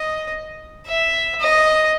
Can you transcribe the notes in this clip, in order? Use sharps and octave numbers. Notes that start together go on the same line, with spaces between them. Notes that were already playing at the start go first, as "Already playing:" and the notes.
Already playing: D#5
E5
D#5